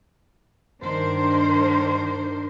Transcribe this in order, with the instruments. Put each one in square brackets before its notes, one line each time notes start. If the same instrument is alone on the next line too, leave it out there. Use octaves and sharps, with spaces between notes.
[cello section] G2 D#3 D4 A#4 C5